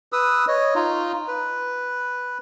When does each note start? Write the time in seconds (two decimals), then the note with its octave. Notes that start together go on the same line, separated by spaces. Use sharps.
0.13 B4 D#6 E6
0.48 C#5 D#5
0.75 D#4 F4
1.28 B4